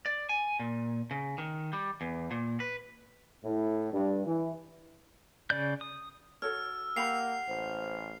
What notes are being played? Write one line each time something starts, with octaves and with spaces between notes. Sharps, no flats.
D5
G#5
A#2
C#3
D#3
G3
E2
A#2
B4
A2
G2
E3
C#3 D5 G6
D#6
F#4 A4 C#5 E6 F6
A#3 G4 F#5 B5 C7 F7
A1 C5